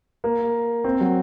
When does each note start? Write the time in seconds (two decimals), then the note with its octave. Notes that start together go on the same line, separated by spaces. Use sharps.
0.24 A#3
0.84 C4
1.00 F#3